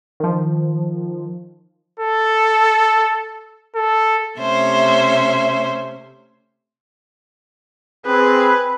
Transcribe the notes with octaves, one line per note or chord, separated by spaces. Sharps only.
D#3 F3
A4
A4
C3 A3 C#4 C5 E5
C4 G#4 B4